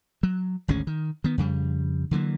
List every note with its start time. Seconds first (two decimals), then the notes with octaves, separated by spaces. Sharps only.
0.23 F#3
0.68 G#1 D2 G#3 C#4
0.87 D#3
1.24 D#3 B3
1.38 F2 C#3 G3
2.11 D3 E3 F#3 A#3